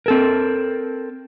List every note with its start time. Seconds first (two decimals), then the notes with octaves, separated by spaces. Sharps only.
0.06 C4 A4 A#4